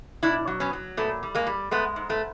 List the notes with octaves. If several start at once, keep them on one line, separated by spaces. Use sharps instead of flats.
B2 D4 E4
F#3
B3 C#4
F#3
A#2 A3 B3
G3
G#3 A#3
G3
G#3 A3 B3
G#2
A3 B3